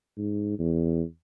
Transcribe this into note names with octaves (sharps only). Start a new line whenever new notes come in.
G#2
E2